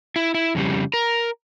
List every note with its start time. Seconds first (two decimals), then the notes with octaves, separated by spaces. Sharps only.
0.16 E4
0.34 E4
0.55 F2 C#3 G3
0.94 A#4